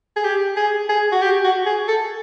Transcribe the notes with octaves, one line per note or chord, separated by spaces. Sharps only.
G#4
G4
G#4
G#4
F#4
G4
F#4
G#4
A4